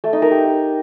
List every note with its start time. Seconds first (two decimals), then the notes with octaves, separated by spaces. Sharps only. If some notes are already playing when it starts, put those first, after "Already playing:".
0.04 A3
0.13 D#4
0.22 A#4
0.31 G4